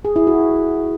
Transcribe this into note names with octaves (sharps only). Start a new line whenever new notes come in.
G#4
E4
F#4